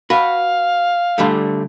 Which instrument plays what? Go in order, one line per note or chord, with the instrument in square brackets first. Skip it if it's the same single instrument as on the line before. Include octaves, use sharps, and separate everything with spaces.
[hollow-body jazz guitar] F#4 B4 [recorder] F5
[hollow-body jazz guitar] D3 G3 A3